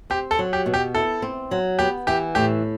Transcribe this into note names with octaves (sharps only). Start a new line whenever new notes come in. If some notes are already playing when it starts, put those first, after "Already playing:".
C4 G4
A4
F#3
G4
B2
G4
E4 A4
C4
F#3
B3 G4
E3 G4
A2 G4